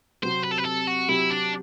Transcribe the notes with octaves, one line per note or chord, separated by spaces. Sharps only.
C3 F#3 C4 G4 C5
B4
A4
B4
A4
F#4
C3 F#3 C4 E4 G4
D4